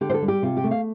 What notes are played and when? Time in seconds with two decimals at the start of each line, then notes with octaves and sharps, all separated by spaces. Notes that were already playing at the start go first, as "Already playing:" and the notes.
0.01 D3 G4
0.10 C5
0.14 A4
0.22 G3
0.28 G4
0.42 C3 F4
0.57 G4
0.64 A3
0.71 F5